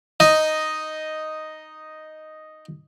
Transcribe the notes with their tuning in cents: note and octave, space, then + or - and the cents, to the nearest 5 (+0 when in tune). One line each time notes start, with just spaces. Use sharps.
D#4 +0 D#5 +0